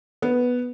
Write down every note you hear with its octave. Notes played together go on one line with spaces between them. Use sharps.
B3